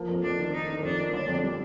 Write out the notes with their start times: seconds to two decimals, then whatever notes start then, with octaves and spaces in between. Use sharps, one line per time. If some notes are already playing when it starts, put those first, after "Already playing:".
Already playing: F3 A#3
0.09 F2
0.23 F2 D4
0.39 D#3
0.53 D#3 D#4
0.68 D#3
0.83 F2 D4
0.98 A#3
1.13 G1 D4
1.28 F2
1.43 G3